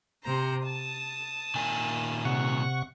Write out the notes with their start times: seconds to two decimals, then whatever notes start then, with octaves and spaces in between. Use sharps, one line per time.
0.22 C3 C5 A#5
0.64 A5 D#6
1.55 A#2 D#3 G#5
2.25 C3 F#5 C#6